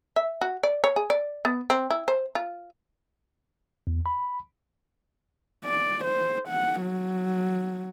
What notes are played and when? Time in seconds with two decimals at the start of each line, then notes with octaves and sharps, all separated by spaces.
0.16 E5
0.41 F#4
0.63 D5
0.84 C#5
0.96 G#4
1.10 D5
1.45 B3
1.70 C4
1.90 E4
2.08 C5
2.35 F4
3.87 E2
4.06 B5
5.65 D5
6.05 C5
6.48 F#5
6.81 F#3